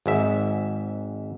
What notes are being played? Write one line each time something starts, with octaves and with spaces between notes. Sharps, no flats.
G#1 G#2 E5